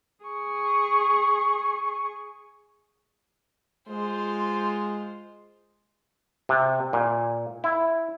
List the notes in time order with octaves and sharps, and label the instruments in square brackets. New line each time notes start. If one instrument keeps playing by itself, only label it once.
[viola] G#4 C#6
[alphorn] G#3 [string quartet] F4 C5
[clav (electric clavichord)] C3
A#2
E4